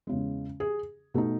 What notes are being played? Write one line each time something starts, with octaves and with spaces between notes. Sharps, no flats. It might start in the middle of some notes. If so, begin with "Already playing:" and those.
E2 C#3 G#3
G#4
B2 A3 D#4